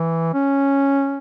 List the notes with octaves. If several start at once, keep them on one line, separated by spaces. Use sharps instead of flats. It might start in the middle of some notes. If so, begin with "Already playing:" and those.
Already playing: E3
C#4